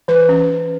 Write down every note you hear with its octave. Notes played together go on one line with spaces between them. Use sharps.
E3 B4
C#4